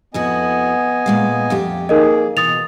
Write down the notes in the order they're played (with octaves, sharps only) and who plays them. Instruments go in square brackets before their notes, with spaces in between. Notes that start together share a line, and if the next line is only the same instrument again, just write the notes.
[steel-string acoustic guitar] F2 E4 F#4 [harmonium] B3 D#5 G#5
[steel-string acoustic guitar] A#2 G#3 F5
F2 A3 G4
[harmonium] A#3 G#4 [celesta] D#4 A#4 D#5
[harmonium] B2 [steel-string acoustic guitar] E3 [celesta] D#6 A6 F7